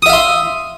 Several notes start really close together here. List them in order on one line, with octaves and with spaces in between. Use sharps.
D#6 E5 F5 C6